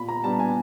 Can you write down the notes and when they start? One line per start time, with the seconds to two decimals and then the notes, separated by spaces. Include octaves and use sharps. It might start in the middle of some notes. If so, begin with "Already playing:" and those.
Already playing: A#2 B5
0.08 A#5
0.24 G3 B3 D4 A5
0.39 G#5